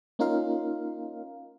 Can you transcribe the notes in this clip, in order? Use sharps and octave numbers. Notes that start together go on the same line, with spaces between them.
A#3 C#4 D#4 F4 A#4 F5